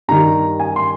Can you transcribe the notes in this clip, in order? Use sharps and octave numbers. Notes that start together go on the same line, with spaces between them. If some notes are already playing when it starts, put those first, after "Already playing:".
G2 D#3 G3 A#5
G#5
C6